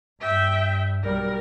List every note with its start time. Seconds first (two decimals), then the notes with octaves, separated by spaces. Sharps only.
0.20 G2 E5 G5
1.03 B1 G3 A#4